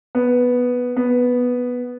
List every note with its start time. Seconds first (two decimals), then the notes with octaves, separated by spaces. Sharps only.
0.15 B3
0.97 B3